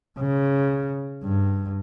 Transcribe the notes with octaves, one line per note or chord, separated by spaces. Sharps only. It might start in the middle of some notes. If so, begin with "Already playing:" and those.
C#3
G2